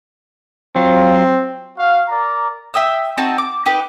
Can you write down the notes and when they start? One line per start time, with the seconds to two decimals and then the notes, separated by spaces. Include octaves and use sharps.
0.76 F#3 C4 F4
1.77 F#4 F5
2.08 A#4 D5 A#5
2.74 E5 G5 D#6 E6
3.17 C4 D#4 F#4 A5
3.38 D6
3.66 D#4 G4 B4